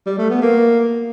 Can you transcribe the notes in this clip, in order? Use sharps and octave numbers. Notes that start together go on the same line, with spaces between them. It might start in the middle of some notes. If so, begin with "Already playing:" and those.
G3
A3
B3
A#3